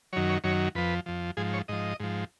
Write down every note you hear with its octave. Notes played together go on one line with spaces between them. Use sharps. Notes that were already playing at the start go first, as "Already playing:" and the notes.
F#2 D#3 F#3 C#5
C#5
F#2 D#3 F#3 C#5
F2 F3 B4
F2 F3
G#2 F3 G#4
C#5
G#2 F3 D#5
G#2 F3